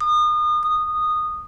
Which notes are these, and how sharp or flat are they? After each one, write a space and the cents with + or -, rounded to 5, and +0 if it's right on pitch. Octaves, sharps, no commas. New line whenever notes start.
D#6 -35
D#6 -15